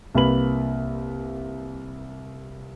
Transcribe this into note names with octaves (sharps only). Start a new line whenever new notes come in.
C2 A#3 B4 B5 F#7